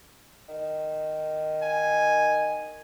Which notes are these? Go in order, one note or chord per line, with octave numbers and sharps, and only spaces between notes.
D#3
G#5